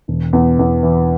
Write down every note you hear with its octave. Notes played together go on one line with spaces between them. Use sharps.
E1
E2
E2
E3